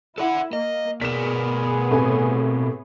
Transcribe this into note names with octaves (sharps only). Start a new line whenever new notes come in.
E4 A4 D5 F#5
A#3 D#5
B2 B3 G#4 A#4 D5 B6 E7
A2 C3 G#5